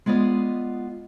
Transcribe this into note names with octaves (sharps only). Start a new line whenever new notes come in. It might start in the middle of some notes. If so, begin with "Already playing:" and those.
G#3 B3 F4 D5 D#5